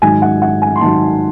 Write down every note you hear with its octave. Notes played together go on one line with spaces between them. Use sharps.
G#2 D#3 F#3 G#5
F#5
F#5
G#5
C6
G#2 D#3 F#3 A5